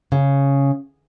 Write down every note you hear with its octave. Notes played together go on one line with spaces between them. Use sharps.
C#3